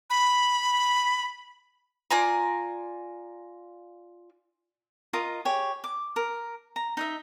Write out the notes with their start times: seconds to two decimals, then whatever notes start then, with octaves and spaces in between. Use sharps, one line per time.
0.10 B5
2.10 F4 D5 G#5 A#5
5.13 F4 A#4 D#5 D#6
5.45 G4 G#4 C#5
5.84 D6
6.16 A#4
6.76 A#5
6.97 D#4 D#5 E5